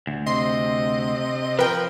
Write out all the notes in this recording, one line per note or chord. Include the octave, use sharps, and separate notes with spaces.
D2
C3 D#5 C6
F3 A#4 B4 G5